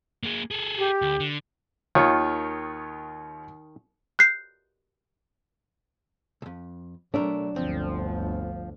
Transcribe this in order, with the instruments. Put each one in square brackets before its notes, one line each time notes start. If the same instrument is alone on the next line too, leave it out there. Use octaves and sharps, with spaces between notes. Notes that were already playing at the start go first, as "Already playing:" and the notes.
[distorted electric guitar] A#3 G#4
G#4 A4
[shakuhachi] G4
[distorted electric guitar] D2
D3
[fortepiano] D#2 F4 C#5 [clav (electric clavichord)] D#3
[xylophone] F#6 G6 C7
[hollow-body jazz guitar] C2 F2
[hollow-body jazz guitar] B1 A3 A#4 [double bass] F#3 [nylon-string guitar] D4
[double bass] G1 D2 [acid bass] F3 [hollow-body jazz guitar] C4